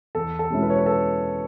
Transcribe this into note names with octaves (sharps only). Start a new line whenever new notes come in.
E2 A4
A4
B2 G#3 C#4 E4
B4
C#5
B4
A4